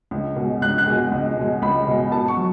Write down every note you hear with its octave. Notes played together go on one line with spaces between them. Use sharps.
C#2
B2 G#3
C#2 F#6
F#6
B2 G#3
C#2
B2 G#3
C#2 B5
B2 G#3
B2 A5
C#6
F#3